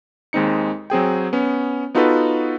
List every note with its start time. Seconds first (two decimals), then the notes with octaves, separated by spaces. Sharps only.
0.33 D#2 G#3 C4 D#4 C#7
0.90 F#3 C4 G#4 G5
1.33 B3 C#4
1.95 B3 D#4 F4 F#4 A4 B4